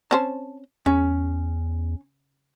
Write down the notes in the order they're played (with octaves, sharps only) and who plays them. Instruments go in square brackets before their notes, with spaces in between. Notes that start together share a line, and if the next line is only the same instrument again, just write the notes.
[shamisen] C4 C#4 C5 [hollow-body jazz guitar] A5
[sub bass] E2 [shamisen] C#3 [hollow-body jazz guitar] C#4